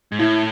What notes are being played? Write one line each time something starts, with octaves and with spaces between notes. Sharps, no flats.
G#2
A2 E4